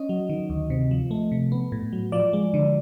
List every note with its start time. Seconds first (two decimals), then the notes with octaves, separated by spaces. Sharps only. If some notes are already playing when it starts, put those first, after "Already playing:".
Already playing: C#4 D#5
0.09 F#3
0.29 D#3
0.50 D2
0.70 C3
0.91 F3
1.11 A3
1.31 C3
1.52 B3
1.72 A2
1.92 F#3
2.12 F3 D5
2.33 G#3
2.54 D3